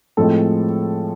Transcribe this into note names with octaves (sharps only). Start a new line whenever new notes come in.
A2 F3 G#3 C4 A4